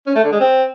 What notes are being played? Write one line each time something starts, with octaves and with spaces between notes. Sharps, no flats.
C#4
A3
D3
G#3
C4